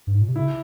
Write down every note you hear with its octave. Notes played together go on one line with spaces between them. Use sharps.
G2
G#2
A#2
C3
C#3 E4